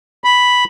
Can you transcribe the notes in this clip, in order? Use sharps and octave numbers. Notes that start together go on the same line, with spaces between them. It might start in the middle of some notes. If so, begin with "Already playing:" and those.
B5